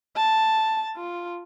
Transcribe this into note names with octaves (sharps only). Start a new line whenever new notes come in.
A5
F4